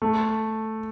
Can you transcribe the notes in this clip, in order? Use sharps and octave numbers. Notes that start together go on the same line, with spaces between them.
A3